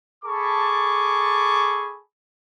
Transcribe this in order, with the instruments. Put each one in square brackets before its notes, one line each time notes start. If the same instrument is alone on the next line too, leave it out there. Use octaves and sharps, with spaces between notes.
[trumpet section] G#4 A4 A5 B5 C#6 D6